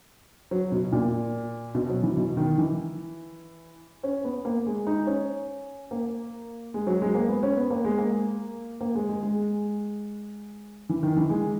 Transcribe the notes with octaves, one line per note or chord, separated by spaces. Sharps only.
F#3
B2
A#2
B2
F#3
E3
B2
D#3
E3
C#4
B3
A#3
G#3
D#4
C#4
A#3
G#3
F#3
G#3
A#3
B3
C#4
B3
A#3
G#3
A#3
A#3
G#3
G#3
G#3
E3
D#3
E3
G#3